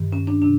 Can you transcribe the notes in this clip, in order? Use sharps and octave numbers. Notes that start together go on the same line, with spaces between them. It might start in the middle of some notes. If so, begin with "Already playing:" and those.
Already playing: G2 D#3
C#4
D4
C3 D4